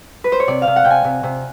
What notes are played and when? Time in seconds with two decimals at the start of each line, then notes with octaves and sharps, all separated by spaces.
0.24 B4
0.32 C5
0.40 C#5
0.48 C3 D5
0.62 F5
0.67 C3
0.76 F#5
0.84 C3 G5
0.91 G#5
1.04 C3
1.23 C3